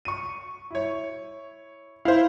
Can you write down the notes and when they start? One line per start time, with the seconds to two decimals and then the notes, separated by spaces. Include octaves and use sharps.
0.05 C#6 D#7
0.71 E4 C#5
2.05 E4 C5 F5